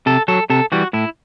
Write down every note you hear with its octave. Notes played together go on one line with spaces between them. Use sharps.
C3 A4
F#3 A4
C3 A4
E3 G3 F#4
A2 E4